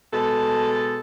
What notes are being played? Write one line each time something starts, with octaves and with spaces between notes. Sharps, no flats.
B2 G#3 A4